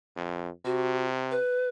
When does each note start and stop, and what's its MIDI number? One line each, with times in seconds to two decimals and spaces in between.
0.16 0.50 41
0.65 1.37 48
0.65 1.07 66
1.31 1.69 71